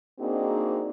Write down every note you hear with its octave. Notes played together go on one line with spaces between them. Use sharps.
A#3 C4 D4 D#4 F#4 G#4